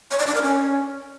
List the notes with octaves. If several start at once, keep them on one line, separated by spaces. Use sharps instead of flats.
C#5
D5
D4
A#4
C#4